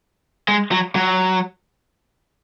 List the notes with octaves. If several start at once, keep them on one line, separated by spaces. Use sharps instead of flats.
G#3
F#3
F#3